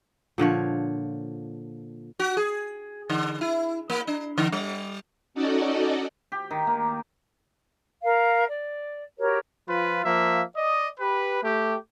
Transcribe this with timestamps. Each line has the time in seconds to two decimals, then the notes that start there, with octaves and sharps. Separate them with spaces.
0.38 A#2 D3 F3 C#5
2.19 F#4
2.37 G#4
3.10 D3
3.41 E4
3.90 A#3
4.07 D4
4.38 D3
4.52 G3
5.34 C#4 D#4 F#4 A4 D5 D#5
6.32 G4
6.51 D#3
6.67 A#3
8.02 A#4 F5
8.48 D5
9.17 F#4 G4 A#4 C#5
9.68 F3 F4 B4
10.05 F3 A#3 E5
10.56 D5 D#5
11.00 G4 B4
11.43 A3 G4